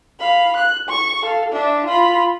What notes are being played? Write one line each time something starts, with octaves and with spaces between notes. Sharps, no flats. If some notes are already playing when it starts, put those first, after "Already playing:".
F5 B5
F#6
C#6
A4 F5
D4 E5
F4 B5